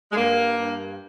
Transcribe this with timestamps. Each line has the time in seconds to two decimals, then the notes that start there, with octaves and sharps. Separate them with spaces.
0.12 G#3
0.16 G2 A#3
0.58 G2